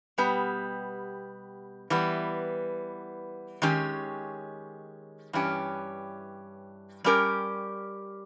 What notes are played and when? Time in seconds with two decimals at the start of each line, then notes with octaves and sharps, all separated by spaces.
0.18 B2 G3 B3 G4
1.90 E3 G3 B3
3.62 D#3 G#3 C#4 G4
5.33 G2 E3 C#4 G4
7.04 G3 C#4 G4 A#4